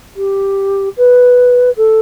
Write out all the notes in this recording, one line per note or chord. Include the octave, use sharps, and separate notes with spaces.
G4
B4
A4